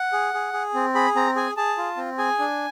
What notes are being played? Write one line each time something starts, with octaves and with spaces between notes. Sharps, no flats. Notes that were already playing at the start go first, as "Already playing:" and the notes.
Already playing: F#5
G#4
G#4
G#4
C4
G#4 B5
C4 A#5
G#4 G#5
G#4 A5
F4
C4
G#4 G#5
D4